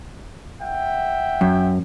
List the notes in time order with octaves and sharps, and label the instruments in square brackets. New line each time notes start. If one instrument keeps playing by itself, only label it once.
[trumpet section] E5 F#5 G5
[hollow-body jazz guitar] F#2